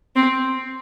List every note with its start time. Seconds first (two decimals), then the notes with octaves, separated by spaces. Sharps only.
0.16 C4